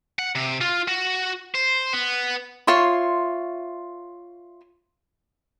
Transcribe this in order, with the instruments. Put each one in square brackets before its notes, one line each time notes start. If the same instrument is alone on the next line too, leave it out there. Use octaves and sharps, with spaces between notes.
[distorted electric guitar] F#5
C3
F4
F#4
C5
B3
[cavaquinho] F4 C#5 E5 C6